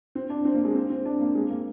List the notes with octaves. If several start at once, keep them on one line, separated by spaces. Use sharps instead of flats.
C4
D4
C4
A#3
G#3
C4
C4
D4
A#3
G#3
A#3